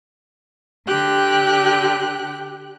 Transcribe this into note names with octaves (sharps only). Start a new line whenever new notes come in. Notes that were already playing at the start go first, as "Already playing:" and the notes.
D3 G4 G5 F#6